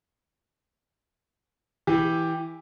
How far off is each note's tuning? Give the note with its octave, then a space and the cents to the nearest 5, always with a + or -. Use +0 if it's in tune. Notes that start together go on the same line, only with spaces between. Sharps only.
E3 -5 G4 +0